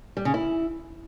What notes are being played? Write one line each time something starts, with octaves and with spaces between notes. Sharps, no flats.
G3
C#3
E4